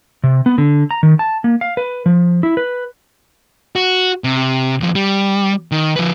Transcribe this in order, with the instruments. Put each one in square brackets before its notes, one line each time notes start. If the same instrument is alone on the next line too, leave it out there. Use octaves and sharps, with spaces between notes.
[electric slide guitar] C3
B3
D3
A#5
D#3
A5
A#3
F5
B4
F3
E4
B4
[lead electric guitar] F#4
C3
D#2 F3
G3
D#3
F3 B4